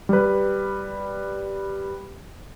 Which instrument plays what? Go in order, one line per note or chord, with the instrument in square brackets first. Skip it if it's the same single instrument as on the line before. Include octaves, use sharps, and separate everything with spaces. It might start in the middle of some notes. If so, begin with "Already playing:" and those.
[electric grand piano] G3 B4